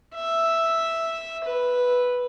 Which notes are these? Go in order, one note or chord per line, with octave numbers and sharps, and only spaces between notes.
E5
B4